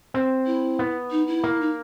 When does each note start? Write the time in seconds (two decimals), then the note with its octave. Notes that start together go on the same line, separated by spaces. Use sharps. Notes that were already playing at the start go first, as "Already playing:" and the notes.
0.14 C4
0.46 E4
0.79 B3
1.11 D#4
1.27 E4
1.44 A#3
1.61 D#4